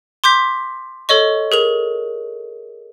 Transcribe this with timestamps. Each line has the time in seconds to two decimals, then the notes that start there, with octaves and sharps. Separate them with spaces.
0.24 C6 D6 G6 B6
1.09 A4 C#5 D#5 C#6
1.52 G#4 A#4 F7